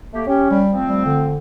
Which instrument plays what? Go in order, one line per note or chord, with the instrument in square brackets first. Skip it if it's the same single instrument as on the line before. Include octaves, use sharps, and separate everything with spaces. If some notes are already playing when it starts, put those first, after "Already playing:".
[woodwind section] A3 A#3 G4
[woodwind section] C#4 [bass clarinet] G4
[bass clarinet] G3
[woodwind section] F3 A3 C4
[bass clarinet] G3
D3